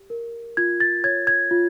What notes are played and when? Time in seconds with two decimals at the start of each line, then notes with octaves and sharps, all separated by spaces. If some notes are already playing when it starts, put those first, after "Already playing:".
Already playing: G4
0.10 A#4
0.57 F4 G#6
0.80 A6
1.04 C#5 G#6
1.27 G#6
1.51 F4